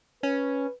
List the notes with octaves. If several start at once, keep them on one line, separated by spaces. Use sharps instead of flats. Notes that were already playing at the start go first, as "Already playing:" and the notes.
C#4 B4